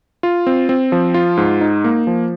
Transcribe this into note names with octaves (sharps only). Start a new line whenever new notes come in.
F4
C4
C4
F3
F4
G#2
D#4
A#3
F3